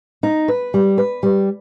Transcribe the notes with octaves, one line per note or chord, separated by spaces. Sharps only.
D#4
B4
G3
B4
G3